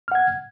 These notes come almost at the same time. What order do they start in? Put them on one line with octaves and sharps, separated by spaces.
F6 F#5 G#6